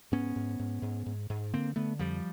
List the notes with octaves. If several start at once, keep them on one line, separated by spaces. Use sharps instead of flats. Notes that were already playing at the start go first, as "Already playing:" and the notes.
G#2 B3 C#4
G#2
G#2
G#2
G#2
G#2
D3 A#3 C4
D3 A3 B3
F2 F3 G3